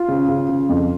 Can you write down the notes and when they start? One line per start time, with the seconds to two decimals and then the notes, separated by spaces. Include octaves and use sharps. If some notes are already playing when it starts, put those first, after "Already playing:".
Already playing: F4
0.08 C#3
0.28 C#3
0.49 C#3
0.69 F2